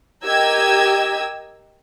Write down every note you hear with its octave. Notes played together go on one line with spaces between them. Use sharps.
G4 A#4 D#5 E6 G#6